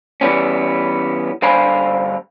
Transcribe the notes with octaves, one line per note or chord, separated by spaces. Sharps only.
E3 G3 B3 C#4
G2 D3 C5 F5 G#5 B5